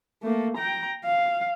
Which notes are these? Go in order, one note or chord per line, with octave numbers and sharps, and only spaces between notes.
A3 A#3
G5 A#5
F5